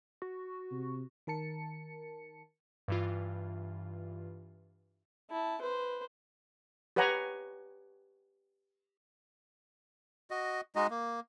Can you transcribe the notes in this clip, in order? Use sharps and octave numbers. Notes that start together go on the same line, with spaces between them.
F#4
C3
D#3 A#4 A5 C#7
G2 E3 F4
E4 A5
B4 C5
G4 B4 C#5 F#5 G#5 A#5
F#4 D#5
G#3 D#4 F#4 D#5
A#3